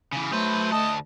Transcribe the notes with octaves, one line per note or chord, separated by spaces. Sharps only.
C#3 E3
F#3 A3 B4 C5
D2 D#5 A5